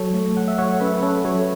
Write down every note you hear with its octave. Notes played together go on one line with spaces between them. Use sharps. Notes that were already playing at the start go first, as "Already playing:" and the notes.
Already playing: F#3 A4 C#5
A3
A3 F#5
E5
F#3 C#5 F#5
C#4 B4 E5
B4
C#4 A4 C#5
F#3 A4 C#5